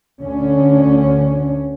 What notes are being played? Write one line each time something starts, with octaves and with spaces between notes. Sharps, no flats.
D2 D3 C#4